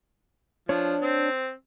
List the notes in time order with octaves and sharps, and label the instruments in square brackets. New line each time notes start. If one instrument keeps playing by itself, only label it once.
[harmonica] F3 [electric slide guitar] D4 C#5
[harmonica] C4